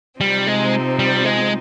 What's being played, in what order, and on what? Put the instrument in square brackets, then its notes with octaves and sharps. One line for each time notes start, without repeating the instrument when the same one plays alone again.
[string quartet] C3 F3 C4 D#4 [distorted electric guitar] G3
[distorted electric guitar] G#3
G3
G#3